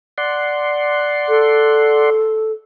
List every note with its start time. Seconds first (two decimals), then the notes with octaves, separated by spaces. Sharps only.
0.18 D5 F#5 C6
1.29 A4